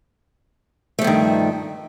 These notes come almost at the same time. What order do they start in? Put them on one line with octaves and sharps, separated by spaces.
A3 F3 G2 D#3